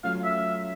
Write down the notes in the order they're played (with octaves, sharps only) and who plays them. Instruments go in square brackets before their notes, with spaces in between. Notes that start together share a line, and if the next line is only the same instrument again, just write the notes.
[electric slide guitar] F#3 A3 C#4 F4 [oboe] F5
[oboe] E5